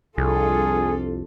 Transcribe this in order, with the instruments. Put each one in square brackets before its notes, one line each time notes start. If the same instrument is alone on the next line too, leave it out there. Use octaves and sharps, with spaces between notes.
[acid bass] C2 [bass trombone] F2 [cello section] D4 F4 A4 [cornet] G#4